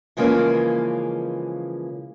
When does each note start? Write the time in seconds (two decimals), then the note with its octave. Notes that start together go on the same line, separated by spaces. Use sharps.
0.17 C#3 E3 F3 G#3 A#3 C#4